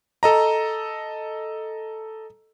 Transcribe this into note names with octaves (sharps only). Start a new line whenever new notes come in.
A4 D#5 A#5